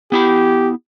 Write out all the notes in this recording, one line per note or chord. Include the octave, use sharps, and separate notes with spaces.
B3 E4 G4 B5